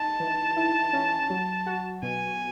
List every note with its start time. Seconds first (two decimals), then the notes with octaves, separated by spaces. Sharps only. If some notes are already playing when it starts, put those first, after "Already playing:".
Already playing: D#4 A5
0.20 E3
0.56 E4
0.93 C#4
1.30 F#3
1.66 F#4
2.03 B2 G#5